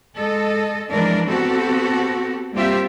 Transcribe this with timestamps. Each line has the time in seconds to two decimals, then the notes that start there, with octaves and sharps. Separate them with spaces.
0.15 G#3 A4 D#5
0.90 E3 F3 G#3 D4 A#4 D5
1.28 B3 C4 F#4 G4 A4
2.53 G3 A#3 C4 F4 G4 E5